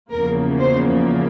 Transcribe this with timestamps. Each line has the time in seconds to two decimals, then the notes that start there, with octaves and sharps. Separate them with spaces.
0.11 E2 C#3 F3 A#3 A#4
0.60 C5